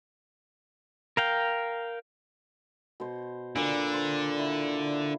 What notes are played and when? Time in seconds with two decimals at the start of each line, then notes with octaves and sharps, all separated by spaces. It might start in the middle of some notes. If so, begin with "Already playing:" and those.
1.17 A#4 F5 G5
3.00 B2 C5
3.56 A#2 D3 B4 D5
3.94 C5
4.39 E4